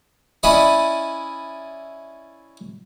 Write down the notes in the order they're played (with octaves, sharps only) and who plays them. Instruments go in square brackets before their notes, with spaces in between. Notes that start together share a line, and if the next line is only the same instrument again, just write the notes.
[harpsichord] C#4 E4 D5 D#5 B5